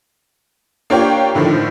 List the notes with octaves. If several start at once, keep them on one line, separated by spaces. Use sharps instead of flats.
A#3 D4 F4 G4 C#5 G5
A2 D3 D#3 F3